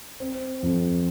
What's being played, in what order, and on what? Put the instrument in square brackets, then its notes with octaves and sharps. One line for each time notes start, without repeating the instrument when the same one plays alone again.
[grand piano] C4
F2